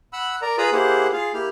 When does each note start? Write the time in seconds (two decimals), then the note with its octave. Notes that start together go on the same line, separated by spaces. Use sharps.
0.13 F#5 B5 E6 F#6
0.42 A#4 D5 A#5
0.58 F4 G#4 B4 A#5 B5 D#6
0.72 A#3 E4 G4 G#4 C5 F#5
1.13 F4 G#4 F5
1.34 A#3 E4 G4 F6